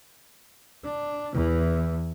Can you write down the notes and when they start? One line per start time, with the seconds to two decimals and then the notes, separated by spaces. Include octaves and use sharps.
0.84 D4
1.34 E2 E3